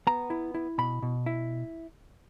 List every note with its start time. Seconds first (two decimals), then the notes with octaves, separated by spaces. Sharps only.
0.07 B3 A#5
0.30 E4
0.54 E4
0.78 B2 B5
1.02 B2
1.26 E4